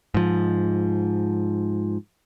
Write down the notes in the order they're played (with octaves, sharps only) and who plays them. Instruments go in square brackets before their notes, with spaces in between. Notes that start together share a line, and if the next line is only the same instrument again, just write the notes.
[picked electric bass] G#2 F3